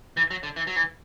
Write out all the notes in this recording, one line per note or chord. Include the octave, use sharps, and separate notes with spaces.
E3
F#3
D3
E3
F#3
E3